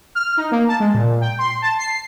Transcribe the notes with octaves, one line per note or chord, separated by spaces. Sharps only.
F6
D#4
A#3
A5
G#3
A#2
G5
C6
A5
C7